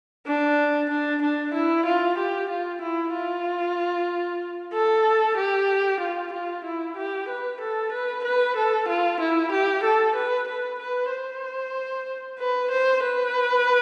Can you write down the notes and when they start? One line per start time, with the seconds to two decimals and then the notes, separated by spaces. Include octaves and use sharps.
0.27 D4
0.90 D4
1.22 D4
1.54 E4
1.86 F4
2.18 G4
2.49 F4
2.81 E4
3.13 F4
4.73 A4
5.37 G4
6.00 F4
6.33 F4
6.64 E4
6.96 G4
7.28 B4
7.61 A4
7.92 B4
8.24 B4
8.56 A4
8.88 F4
9.20 E4
9.51 G4
9.83 A4
10.15 B4
10.48 B4
10.79 B4
11.11 C5
12.39 B4
12.71 C5
13.03 B4